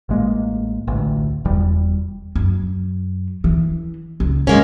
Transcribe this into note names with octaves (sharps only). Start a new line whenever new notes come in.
A1 G#3 A#3
A1 D2
F1 E2 G3
F#2
E3
C#2
G#3 A#3 C#4